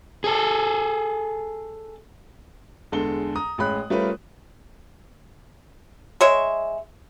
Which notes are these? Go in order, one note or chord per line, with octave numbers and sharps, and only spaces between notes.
G#4 A4
E2 D3 G#3 A4 G7
A#5 D#6
A1 G#3 C#4 B5 F#6
G3 A3 C#4 F4 A#4 B4
G#3 C#5 E5